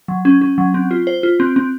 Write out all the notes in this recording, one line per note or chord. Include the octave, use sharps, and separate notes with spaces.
F#3
C#4
C#4
F#3
C4
F4
C5
F4
C4
C4